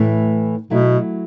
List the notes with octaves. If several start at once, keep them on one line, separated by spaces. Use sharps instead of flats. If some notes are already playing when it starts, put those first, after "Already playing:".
Already playing: A2 E3 A3 E4
B2 F#3 A3 E4